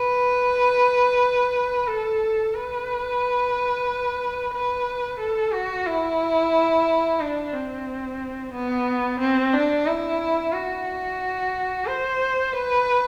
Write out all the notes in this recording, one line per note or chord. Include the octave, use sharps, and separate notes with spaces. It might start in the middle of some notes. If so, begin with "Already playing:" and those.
Already playing: B4
A4
B4
B4
A4
F#4
E4
D4
C4
B3
C4
D4
E4
F#4
C5
B4